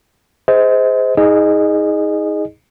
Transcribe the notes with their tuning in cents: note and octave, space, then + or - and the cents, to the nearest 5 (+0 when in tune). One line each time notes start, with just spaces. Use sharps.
G#4 +0 C5 -20 D#5 +30
D#4 +35 G#4 +0 D#5 -25